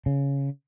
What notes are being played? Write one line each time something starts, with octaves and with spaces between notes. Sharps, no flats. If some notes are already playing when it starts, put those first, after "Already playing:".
C#3